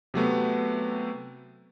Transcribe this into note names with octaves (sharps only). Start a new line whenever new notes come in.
C3 F#3 A3 B3